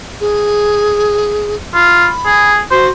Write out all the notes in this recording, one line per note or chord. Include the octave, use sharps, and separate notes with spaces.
G#4
F4 B5
G#4
F#4 C5